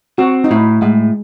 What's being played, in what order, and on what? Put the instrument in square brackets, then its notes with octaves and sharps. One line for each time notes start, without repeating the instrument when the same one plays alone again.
[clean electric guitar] C4 [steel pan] F#4
[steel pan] D#4
[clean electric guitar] A2 [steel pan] E4
[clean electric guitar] A2 [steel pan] G#3